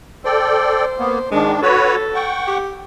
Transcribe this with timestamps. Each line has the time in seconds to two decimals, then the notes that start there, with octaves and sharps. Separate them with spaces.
0.25 A4 C5 D5 G5
0.98 A#3 B3
1.31 G#2 D#3 G#3 D4
1.62 F#4 A4 B4 C#5
2.15 F#5 G5 C#6
2.48 G4